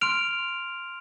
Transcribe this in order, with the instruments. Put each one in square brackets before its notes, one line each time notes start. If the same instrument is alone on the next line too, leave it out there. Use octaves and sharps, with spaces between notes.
[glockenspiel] C6 F6 D7 F7